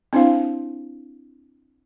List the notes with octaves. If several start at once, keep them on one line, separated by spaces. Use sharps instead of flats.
C4 D4 E4 C5 F5